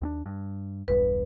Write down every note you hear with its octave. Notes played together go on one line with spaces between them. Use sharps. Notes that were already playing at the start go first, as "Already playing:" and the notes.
D#2 C4 D4
G2
E1 B1 G2 B4